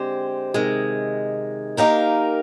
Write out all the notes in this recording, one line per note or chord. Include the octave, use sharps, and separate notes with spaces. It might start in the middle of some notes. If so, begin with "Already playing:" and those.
Already playing: D3 G#3 C4 G4 C5
C3 D#3 G#3
A#3 D#4 G4 A#4 F5